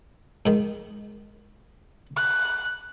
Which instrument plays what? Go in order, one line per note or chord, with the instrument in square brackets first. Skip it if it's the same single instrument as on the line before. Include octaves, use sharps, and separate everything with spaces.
[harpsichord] G#2 D#3
[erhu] F#6